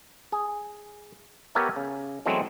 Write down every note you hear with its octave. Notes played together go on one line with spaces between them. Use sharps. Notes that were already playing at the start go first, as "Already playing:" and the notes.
G#4
B3 G4 A#4 C#5 E5 A5
C#3
E3 F#3 G#3 A3 B3 C4